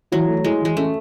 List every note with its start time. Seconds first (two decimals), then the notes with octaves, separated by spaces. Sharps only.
0.12 E3 F#3
0.28 A3
0.44 G#3 E4
0.61 E3 G#3
0.77 A3 C#4